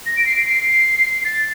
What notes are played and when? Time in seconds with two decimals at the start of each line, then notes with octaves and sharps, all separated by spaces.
0.06 A#6
0.17 D7
0.26 C7
0.36 D7
0.46 C7
1.25 A6